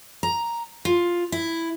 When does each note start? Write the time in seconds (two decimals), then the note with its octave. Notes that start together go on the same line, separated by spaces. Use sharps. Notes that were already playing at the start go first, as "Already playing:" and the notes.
0.23 A#5
0.85 F4
1.32 E4